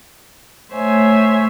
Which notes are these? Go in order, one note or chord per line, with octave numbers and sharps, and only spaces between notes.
A3 C5 C#5 E5 G#5